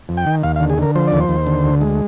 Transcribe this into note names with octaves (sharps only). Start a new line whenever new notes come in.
F2
G5
D#3
D#2 F5
F5
D3
G#4
D3 A#4
F3 C5
D#2 D5
C5
D#2
D3
D2
G#3